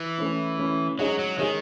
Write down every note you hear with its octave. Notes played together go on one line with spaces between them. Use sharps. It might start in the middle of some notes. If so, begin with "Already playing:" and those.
Already playing: E3
A3 C#4 E4
A3 C#4 E4
F#3 G#3 D#4 G#4 C#5
F#3
D#3 G#3 D#4 G#4 C#5